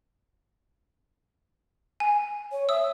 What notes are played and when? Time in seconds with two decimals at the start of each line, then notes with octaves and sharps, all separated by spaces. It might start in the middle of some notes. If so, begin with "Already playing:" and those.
2.00 G#5
2.52 C#5
2.69 E5 D#6 E6